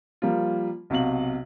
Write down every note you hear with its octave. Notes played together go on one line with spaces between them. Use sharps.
F3 G3 A#3 F4
B1 C3 F#4 F5 F#7